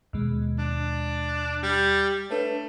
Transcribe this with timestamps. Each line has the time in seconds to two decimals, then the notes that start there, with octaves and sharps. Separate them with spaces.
0.13 D#2 B2 G#3
0.59 D4
1.63 G3
2.30 A3 D4 B4 C#5